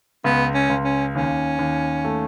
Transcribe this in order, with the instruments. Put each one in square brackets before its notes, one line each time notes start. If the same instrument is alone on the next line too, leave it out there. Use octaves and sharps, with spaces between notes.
[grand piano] C#2 [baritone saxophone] B3
[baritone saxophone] C#4
[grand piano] C#2
[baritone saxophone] C#4
[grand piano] D#2 [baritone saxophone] C#4
[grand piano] D#2
A3